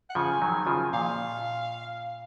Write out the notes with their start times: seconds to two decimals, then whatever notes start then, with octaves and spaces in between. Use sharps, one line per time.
0.10 F#5
0.15 C#3 F3 G#5
0.42 D#3 F#3
0.67 C#3 F3
0.93 A#2 F5